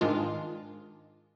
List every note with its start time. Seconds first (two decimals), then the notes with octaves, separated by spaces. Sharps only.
0.01 G#2 D#3 G#3 D4 F4